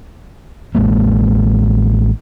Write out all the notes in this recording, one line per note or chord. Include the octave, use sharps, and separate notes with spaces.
A1 G#3 A#3